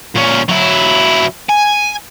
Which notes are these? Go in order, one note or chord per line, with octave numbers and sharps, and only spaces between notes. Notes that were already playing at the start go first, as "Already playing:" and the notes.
A#2 C#4
F#3 E4
G#5